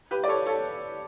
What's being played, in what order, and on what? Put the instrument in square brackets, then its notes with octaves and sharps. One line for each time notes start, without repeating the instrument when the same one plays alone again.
[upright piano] G4 B4
D5
A4 C#5
A4 C#5